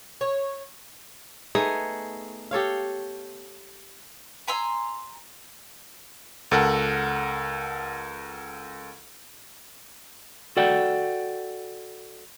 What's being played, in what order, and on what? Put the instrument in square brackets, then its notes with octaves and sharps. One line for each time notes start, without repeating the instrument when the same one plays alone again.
[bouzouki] C#5
[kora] A3 B3 D#4 G#4
G4 A4 C#5 F5
[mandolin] G#5 A#5 C6 E6
[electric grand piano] C#2 A4 A#4 F#5
[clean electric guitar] F#4 A4 D5 F#5 G5